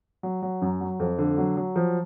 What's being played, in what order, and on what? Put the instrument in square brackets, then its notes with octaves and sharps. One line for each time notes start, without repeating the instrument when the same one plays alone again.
[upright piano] F#3
F#3
F#2
F#3
F2
D3
F#3
F#3
F3